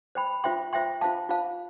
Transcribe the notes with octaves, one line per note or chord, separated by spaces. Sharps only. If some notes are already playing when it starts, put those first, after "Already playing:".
C5 G5 B5
F4 C5 E5 G5 C6
F4 C5 E5 G5 C6
F4 C5 F5 A5
F4 C5 F5 A5